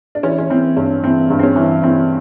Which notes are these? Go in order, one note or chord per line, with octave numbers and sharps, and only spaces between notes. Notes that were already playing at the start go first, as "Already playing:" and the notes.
D4
E3 C#4
C#4
E3 C4
G2 C#4
E3 C4
G2
C4
C#4
E3
E3 C4